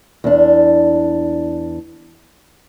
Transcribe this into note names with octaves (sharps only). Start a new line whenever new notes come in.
E2 D4